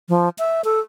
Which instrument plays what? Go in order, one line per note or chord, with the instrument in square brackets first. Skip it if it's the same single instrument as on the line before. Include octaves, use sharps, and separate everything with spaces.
[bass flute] F3
E5
A4